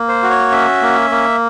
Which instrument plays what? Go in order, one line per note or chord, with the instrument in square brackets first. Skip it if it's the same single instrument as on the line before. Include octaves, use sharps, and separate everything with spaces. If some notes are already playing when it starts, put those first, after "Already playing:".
Already playing: [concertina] A#3
C5
F#4
C#5
C#4 E5
A#3
A#3